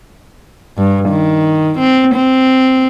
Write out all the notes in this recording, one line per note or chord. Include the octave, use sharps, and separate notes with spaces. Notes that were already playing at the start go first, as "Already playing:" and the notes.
G2
D#3
C4
C4